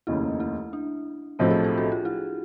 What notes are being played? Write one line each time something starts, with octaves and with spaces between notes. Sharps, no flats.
F1 D#2 C#3 E4
E4
D4
B1 A2 F3 A3 C4
G#4
G4
F#4
F4
E4